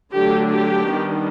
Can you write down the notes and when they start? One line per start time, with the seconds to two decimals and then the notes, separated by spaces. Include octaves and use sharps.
0.13 D3 F#3 A3 D4 G4
0.50 G4
0.88 D#3 G3 B3 D4